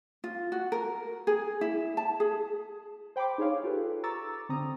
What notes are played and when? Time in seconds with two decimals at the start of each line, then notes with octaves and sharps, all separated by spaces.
0.24 F4
0.52 F#4
0.72 A#4
1.27 G#4
1.61 E4
1.97 A5
2.20 G#4
3.16 C5 G5 B5 C6 D6
3.38 D#4 G#4 C5 C#5 F5
3.63 F4 G4 A4 B4
4.04 A#5 C#6 D6 E6 A6
4.49 D3 C4 A#5 D#6